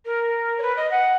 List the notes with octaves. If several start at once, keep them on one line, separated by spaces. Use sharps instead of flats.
A#4
C#5
B4
D#5
F#5